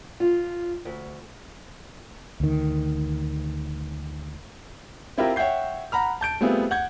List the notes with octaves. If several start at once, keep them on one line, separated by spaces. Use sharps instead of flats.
F4
D2
D2 D#3
C4 E4 F4 G4 A#4
C#5 E5 F#5 G5 G6 C7
F#5 A#5 B5 F6
A5 G6 D7
G3 A3 B3 C4 F4 G#4
F#5 G6 G#6